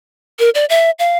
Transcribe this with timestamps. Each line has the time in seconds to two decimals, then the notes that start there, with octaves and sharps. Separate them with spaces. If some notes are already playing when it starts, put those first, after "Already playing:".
0.39 A#4
0.55 D5
0.70 E5
0.99 F5